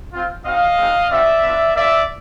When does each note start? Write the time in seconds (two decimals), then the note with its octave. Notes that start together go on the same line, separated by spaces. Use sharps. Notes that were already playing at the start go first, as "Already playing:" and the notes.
0.13 C4 F4
0.45 C4 D#4 F#4 D#5 F5
0.78 G#3 C4 D#4 F#4
1.10 C4 D#4 F#4 D5 E5
1.43 B3 D4 F4
1.75 A#3 C#4 F4 D5 E5